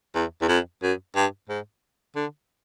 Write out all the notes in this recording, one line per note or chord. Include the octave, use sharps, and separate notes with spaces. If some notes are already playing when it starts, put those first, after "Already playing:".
E2
E2
F2
F#2
G2
G#2
D3